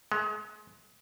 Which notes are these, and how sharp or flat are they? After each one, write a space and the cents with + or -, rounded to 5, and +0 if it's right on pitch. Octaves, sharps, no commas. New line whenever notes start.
G#3 +25